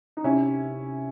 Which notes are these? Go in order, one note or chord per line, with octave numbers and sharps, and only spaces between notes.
D#4
C3 C#4 E4